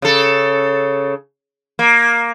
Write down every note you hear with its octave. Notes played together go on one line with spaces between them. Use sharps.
C#3 A4
A#3